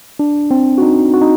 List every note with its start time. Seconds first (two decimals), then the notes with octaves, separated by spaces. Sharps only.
0.20 D4
0.51 C4
0.78 F#4
0.82 D#4
1.13 F#4
1.22 D#4